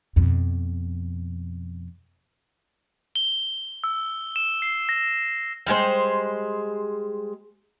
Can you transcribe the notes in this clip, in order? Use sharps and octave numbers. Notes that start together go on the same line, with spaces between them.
F2 B2
G7
E6
E7
C7
A#6
G3 G#3 G#4 C5